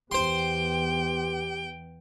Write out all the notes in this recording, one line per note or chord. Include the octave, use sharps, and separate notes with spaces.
E2 B3 G4 C5 G5 C6